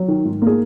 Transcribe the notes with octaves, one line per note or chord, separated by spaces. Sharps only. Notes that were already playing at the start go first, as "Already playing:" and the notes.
Already playing: F#3
D#3
G#2
A#3 G#4